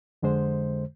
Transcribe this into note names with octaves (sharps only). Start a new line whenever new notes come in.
F2 D3 G#3 C5